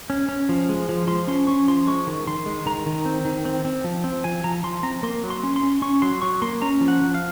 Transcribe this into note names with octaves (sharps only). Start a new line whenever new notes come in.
C#4
C#4
F3
G#3
F3
F3 C6
C#4 C6
C#4 C#6
F3 C6
G#3 C#6
D#3
D#3 C6
G#3
D#3 A#5
D#3
C4
D#3
C4
C4
F3
C4
F3 G#5
F3 A#5
F3 C6
C4 A#5
A#3 C6
F#3
C6
C#4
C6
C#4
C#4 C#6
F#3 C6
F#3 C#6
A#3 C6
C#4 A#5
F3
F#5
F3
F5